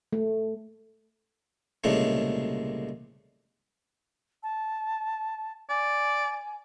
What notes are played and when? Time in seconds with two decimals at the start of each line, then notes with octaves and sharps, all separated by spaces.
0.13 A3
1.84 C2 A#2 C#3 G#3 A3
4.43 A5
5.69 D5 G#5